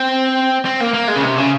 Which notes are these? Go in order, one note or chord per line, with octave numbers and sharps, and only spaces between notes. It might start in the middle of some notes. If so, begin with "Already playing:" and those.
Already playing: C4
C4
A#3
A#3
G#3
C#3
C3
C#3